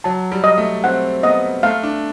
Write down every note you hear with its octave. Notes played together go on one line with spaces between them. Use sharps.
F#3 A5
G3
D#5
A3
C4 F#5
B3 D#5
A3 F5
D4